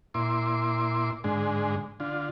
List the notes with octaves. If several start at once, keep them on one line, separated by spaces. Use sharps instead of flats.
A#2 E4 C6 D6
G#2 D3 G#3
D3 F4